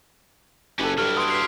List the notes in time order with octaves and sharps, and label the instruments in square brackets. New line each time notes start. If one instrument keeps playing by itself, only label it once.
[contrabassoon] F#1 [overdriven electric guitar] C#4 B4 [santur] G4 A4
[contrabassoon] G2 [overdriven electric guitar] F#3 E4 [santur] A4 C#5 G5 [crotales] F6
[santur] B4 B5 C6 [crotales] D#6 D7
[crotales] B6 C7